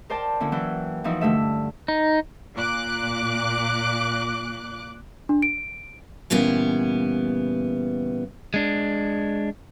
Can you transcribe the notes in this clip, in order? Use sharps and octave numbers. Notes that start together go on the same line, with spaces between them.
A#4 C5 D5 G5 A5 D6
D3 A#3 C#4 E4
E3 F#3 C#4 E4 G5 F#6
E3 F3 D#4 E4 F#4
G2 D3 A3 E5
D#4
A#2 D6 F#6
D4
D7
A#2 C#3 E3 G3 B3
G#3 D4